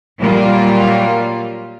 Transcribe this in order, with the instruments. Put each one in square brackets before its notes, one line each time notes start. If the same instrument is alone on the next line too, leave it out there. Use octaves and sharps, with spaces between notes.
[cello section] A#2 F#3 G3 A#3 F4